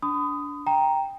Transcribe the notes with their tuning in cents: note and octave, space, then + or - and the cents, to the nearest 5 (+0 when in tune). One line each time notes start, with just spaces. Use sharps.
D4 -20 B5 +40 D#6 +0
G5 +5 A#5 +0